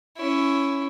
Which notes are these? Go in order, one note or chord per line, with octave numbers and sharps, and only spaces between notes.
C#4 E4